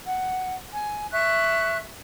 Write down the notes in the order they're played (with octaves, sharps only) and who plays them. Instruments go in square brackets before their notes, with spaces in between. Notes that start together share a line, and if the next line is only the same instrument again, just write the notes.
[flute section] F#5
G#5
E5 C#6 F#6